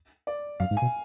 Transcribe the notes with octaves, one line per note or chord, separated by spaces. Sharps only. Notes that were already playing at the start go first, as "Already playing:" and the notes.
D5
F#2 F5
G#2
G#5
B2